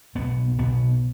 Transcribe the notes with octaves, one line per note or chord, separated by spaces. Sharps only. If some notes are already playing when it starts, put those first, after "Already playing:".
B1 B2 B3
B1 B2 B3